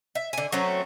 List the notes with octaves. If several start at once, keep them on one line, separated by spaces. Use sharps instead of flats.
E5
D3 G#5
F#3 A3 C4 C#4